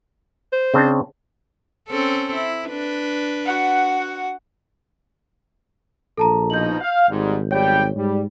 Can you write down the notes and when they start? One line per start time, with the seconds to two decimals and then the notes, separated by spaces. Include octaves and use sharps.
0.53 C5
0.74 C#3 C4 D4
1.89 C4 C#4 A4
2.35 E4
2.67 D4 B4
3.46 F#4 F#5
6.17 A#1 A4 A5 A#5
6.50 B2 F3 D#4 G6 F#7
6.80 F5
7.09 G#1 G#2 G3
7.51 B1 G3 C#5 G5
7.95 G#2 G3